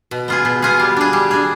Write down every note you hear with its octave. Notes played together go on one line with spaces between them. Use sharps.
B2
B3 F4 G#4
B2
B3 F4 G#4
G3
D4 G#4
G3
D4 G#4